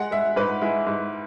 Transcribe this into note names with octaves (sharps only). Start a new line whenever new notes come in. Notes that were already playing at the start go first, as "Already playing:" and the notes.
Already playing: G#3 F#5
G#3 E5
G#2 B4
G#3 E4
G#2